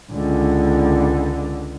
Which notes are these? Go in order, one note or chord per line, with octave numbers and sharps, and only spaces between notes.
C#2 D3